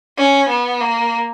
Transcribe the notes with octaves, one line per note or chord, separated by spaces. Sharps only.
C#4
B3
A#3